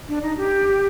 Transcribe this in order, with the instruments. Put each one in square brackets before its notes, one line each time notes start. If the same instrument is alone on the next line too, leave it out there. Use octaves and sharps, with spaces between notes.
[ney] D4
D#4
G4